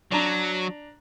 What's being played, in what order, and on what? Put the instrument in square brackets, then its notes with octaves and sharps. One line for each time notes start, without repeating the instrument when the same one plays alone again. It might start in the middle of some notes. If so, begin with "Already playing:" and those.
[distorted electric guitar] F#3 [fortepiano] D4 A#5